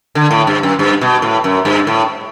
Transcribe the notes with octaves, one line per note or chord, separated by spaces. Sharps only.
D3
A2
G2
F#2
G2
B2
A2
F#2
G2
A2